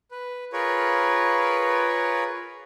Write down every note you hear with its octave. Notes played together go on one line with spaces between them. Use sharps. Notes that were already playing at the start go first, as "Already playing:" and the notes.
B4
F4 G#4 A#4 B4 C#5